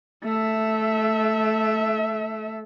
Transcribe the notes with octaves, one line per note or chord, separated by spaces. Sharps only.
A3 E5